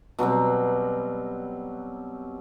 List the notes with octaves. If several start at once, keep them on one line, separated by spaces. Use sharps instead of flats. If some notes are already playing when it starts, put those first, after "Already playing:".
B2 F#3 G3 C4